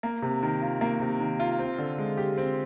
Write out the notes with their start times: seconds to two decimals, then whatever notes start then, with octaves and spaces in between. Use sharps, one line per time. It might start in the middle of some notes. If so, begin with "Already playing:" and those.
0.03 A#3
0.22 C3
0.43 D#3
0.62 F4
0.81 A#3
1.00 C3
1.20 D#3
1.40 F4
1.59 C4
1.78 D3
1.98 G#3
2.17 G4
2.38 C4